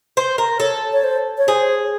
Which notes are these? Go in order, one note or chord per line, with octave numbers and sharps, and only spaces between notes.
C5
A#4
A4 C#5
C#5
C5
C#5
G#4 C5